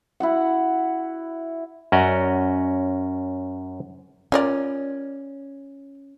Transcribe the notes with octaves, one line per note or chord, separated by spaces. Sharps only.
E4 F#4 F#5
F#2 C#4 F#4 D5 D#5 A#5
C#4 F4 A#4 D5